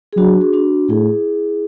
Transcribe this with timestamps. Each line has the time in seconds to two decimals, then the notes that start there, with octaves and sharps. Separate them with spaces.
0.13 G#4
0.17 F#3 D4 F#4
0.41 G#4
0.53 D4 F#4
0.89 A2 E4 G#4